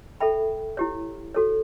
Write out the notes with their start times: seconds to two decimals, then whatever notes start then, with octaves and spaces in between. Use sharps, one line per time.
0.21 A4 E5 G5 B5
0.77 E4 G4 C#5
1.35 F#4 A4 C#5